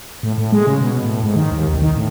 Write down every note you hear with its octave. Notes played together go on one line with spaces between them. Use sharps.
A2
A2
G#3
C#3
B2
A2
G#2
D#3
D#2
C2
D#3
A2